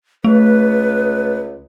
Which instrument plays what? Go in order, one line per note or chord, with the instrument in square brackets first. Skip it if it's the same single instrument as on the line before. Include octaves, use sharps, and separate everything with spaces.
[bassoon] C#2 [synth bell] A3 [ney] B4